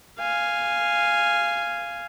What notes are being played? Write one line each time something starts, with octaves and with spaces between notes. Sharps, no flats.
F5 G#5